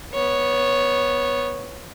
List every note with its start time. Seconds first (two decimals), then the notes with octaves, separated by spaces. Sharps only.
0.14 B3 C#5